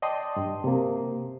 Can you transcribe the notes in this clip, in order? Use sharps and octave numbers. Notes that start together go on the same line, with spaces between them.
D5 D#5 G5 A5 C6 D#6
G2
C3 A#3